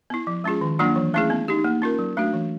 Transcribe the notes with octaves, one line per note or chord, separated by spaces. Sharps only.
B3 E4
F3
G#3 C#4 F4 G#4
D#3
F#3 A#3 D4 F4
E3
A3 C#4 E4 G#4
B3
D#4 G4
A#3
C#4 F4 A#4
F#3
A3 D4 F#4
E3